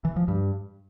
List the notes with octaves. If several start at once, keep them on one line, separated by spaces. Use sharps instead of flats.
E3
F3
G2